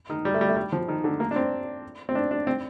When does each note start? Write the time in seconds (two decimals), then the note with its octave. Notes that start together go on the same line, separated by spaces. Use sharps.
0.10 D#3
0.25 G3
0.34 A3
0.41 G3
0.49 A3
0.57 G3
0.72 F3
0.88 D#3
1.04 D3
1.20 A#3
1.31 D4
1.36 C4
2.09 C4
2.15 D4
2.31 D4
2.47 C4